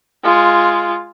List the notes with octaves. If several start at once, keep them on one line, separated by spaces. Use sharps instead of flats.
G#3 F4